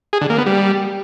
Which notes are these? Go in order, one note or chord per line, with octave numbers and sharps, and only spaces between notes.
G#4
D3
A#3
B3
G3